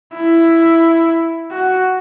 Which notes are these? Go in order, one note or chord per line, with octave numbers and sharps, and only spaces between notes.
E4
F#4